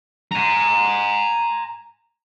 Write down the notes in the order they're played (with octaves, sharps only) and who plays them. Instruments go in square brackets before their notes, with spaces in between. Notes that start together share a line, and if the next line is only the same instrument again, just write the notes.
[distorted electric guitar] G#5 A#5